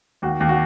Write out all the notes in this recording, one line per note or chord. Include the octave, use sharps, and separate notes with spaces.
D#2 F#4
D#2
F#4